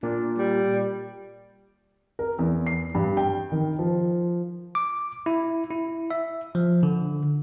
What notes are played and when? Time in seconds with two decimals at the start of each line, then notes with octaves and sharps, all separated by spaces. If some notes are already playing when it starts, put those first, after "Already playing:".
0.03 A#2 D4
0.38 G3
2.19 A#4
2.39 E2
2.67 C7
2.95 G2
3.17 G5
3.52 D#3
3.79 F3
4.75 D6
5.26 E4
5.71 E4
6.11 E5
6.55 F3
6.83 D3